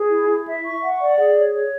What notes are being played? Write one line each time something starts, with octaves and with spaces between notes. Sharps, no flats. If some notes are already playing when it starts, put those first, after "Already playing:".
Already playing: G#4
E4
E4
E5
C#6
F#5
D5
G#4
C#5
C#5